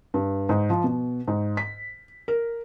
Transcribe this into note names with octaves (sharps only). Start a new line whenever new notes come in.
G2
G#2
F3
B2
G#2
B6
A#4